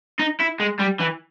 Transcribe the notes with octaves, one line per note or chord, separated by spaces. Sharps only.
D#4
E4
G#3
G3
E3